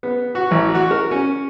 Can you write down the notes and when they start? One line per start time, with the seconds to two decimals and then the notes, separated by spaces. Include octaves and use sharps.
0.03 B3
0.35 F#4
0.51 A1
0.74 F#4
0.91 A#4
1.11 C#4